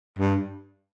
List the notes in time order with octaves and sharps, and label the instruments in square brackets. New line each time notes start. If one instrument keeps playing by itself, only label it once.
[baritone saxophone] G2